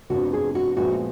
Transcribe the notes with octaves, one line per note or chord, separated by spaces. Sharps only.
F1 F2 F3 B3 D4 F#4
G#4
F#4
A#1 A#2 F3 G#3 B3 F#4